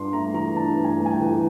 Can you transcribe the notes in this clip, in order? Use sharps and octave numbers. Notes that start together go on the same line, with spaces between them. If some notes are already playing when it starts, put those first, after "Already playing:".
Already playing: G2 D4 C6
A3 A#5
E3 A#5
D4 A5
G2
G#5
A3
G#5
G5
E3